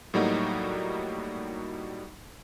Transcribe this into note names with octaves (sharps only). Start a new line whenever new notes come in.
A2 F#3 G3 A#3 D#4 F#4